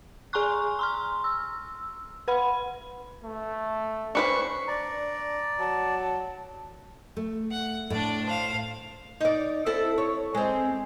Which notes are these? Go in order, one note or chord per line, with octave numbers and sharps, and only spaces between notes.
G#4 G#5 A#5 C6 C#6 F#6
A#5 C6 F6
E6
B4 F#5 B5
A3
C#4 D4 B4 C5 C#6
D4 D5 A#5
F#3 A5
A3
F#5
A2 D4 D5
C5 F5
D#4 D5
C4 E4 A4
C#5
G#3 C4